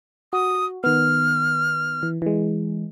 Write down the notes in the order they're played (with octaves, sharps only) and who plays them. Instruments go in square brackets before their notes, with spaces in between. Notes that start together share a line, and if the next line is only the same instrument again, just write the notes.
[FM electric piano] F#4 [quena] D#6
[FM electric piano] D#3 B3 [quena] F6
[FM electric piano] E3
E3 G#3